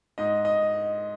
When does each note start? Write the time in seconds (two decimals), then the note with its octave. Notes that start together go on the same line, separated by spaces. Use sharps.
0.18 G#2 D#5
0.45 D#5